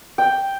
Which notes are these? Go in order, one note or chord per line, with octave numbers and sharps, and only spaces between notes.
G5